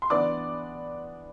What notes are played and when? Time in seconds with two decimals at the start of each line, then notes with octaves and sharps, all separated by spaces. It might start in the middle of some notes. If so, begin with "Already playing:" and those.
0.02 C6
0.10 E3 B3 D4 D5 D6